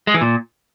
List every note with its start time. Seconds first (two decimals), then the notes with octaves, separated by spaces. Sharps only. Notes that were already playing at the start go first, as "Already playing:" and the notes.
0.07 G#3
0.14 E3
0.21 A#2